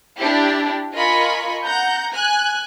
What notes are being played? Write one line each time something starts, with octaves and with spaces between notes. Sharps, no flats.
D4 E4 G4
F4 A#4 D#5 G#5 B5 C#6
F#5 A#5 G6
G#5 F#6